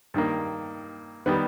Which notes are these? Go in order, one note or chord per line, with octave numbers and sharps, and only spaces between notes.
G2 D#3 A#3
D#3 G3 B3